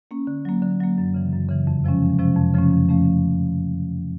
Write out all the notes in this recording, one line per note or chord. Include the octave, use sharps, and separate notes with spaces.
A#3 C#4
D3
F#3 A#3
D3
F#3 A#3
F#2
C#3 E3
F#2
C#3 E3
F2
C3 F3 G#3 C#4
F2
C3 F3 G#3 C#4
F2
C#3 F3 A3 C#4
F2
F3 A3 C#4